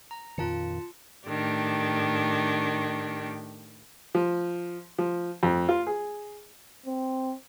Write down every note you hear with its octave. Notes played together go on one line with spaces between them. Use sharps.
A#5
F2 A#2 D#3 F4 A5 C#7
A2 D#3 D4 G4
F3
F3
F2
F4
G#4
C4